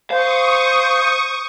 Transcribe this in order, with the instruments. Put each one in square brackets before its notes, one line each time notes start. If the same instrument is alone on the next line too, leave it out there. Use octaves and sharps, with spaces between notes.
[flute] C5 [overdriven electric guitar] F5 [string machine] C#6 D#6